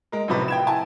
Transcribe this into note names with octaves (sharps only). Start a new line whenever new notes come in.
G#3 A#4
A1 A2 C3 F3 F#3 B4
G5 G#6 E7
E4 G#5 A5